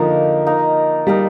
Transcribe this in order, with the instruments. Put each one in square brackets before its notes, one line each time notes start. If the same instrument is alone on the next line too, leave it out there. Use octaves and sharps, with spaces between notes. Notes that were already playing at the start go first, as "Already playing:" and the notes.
Already playing: [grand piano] D3 F3 [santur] A#3 D#4 A#4
[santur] A#3 D#4 A#4
[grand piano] G3 [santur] A#3 D#4 A#4